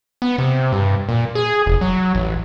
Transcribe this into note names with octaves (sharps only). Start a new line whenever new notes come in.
B3
C3
G2
A#2
G#4
F1
F#3
A1